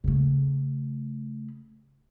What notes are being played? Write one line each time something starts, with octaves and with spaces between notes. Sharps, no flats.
C#3 A3